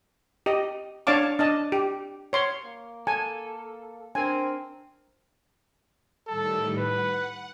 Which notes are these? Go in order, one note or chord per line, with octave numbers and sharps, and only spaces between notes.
G4 D#5
D4 C#5 D5 F5 A5 D6
D4 D#5 A5
G4
C#5 C6
A#3
A4 G#5
C4 D4 A#4 G#5
A2 D#3 G3 A4
B4 F#5